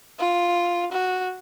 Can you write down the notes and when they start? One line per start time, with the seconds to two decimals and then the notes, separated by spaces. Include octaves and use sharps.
0.19 F4
0.92 F#4